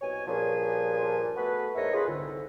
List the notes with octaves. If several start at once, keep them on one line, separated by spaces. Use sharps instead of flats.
C2 B2 C#5 G#5
G2 A#2 F3 C#4 G#4 G#5
A3 B3 F#4 B4
E2 G#2 A3 A#4 C#5 D#5
C#3 F4 G#4 B4
C2 G#2 D3